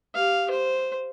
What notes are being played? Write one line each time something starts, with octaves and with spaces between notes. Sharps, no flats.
G4 F5
C5